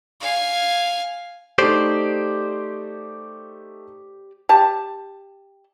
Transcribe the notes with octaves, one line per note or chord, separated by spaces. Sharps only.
F5 G#5
A3 D#4 G4 C5 D5
G4 A5